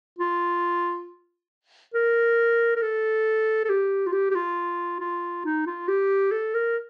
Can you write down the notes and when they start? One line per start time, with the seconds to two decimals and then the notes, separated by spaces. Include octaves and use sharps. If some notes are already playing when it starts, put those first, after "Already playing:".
0.18 F4
1.94 A#4
2.76 A#4
2.82 A4
3.65 A4
3.69 G4
4.06 F4
4.13 G4
4.31 G4
4.35 F4
5.01 F4
5.45 D#4
5.66 F4
5.88 G4
6.32 A4
6.54 A#4